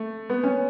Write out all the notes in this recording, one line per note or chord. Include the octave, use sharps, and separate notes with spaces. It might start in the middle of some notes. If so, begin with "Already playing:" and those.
Already playing: A3
B3
C#4